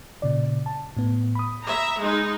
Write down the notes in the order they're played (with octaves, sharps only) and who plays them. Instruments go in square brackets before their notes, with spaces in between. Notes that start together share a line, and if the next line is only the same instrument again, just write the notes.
[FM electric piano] A#2 C#3 D5
A5
A2 B3
B5 D#6
[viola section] E5 A#5
G#3 D#4